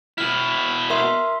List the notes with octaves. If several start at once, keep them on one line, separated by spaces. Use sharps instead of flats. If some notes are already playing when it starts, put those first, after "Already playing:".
B2 E4 F6
A#4 E5 C6